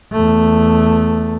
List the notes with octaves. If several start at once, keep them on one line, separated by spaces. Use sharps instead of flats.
E2 A3